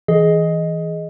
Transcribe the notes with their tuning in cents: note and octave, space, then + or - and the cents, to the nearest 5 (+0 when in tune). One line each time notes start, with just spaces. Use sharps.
E3 -15 G#4 +15 D#5 +0